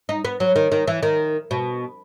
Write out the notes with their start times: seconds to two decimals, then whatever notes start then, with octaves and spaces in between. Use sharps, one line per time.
0.09 D#4
0.25 B3
0.40 F#3
0.56 D#3
0.72 D#3
0.87 E3
1.03 D#3
1.51 B2